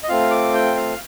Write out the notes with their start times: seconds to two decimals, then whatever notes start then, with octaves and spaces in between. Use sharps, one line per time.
0.03 D#5
0.09 A3 C4 F4 F5
0.31 D6
0.54 G5
0.76 F5